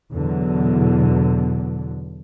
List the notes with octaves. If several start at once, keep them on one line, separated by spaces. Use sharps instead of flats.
E2 B2 D3 F#3